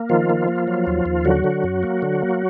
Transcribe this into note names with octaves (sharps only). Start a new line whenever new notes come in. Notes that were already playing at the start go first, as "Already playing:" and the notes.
Already playing: A#3
D#3 F3 F4
A#3
A#3
F#3
D#2
D#2
D3 F#3 F#4
D3
F#2
A#3
D3
A#3